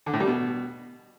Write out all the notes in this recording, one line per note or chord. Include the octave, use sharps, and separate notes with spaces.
D3
A2
G3
B2